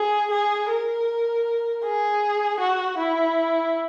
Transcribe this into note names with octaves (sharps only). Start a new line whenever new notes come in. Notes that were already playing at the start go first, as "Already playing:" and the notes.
Already playing: G#4
G#4
A#4
G#4
F#4
E4